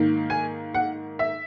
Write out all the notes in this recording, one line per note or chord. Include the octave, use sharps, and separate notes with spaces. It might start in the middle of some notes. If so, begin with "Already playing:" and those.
Already playing: G#2 D#3 A#3
G#5
F#5
E5